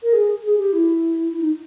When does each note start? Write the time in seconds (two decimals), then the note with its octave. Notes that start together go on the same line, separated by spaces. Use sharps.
0.03 A#4
0.13 G#4
0.43 G#4
0.58 G4
0.73 E4
1.33 E4
1.41 D#4